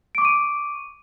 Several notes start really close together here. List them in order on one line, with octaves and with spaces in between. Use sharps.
D7 D6 C#6 D#7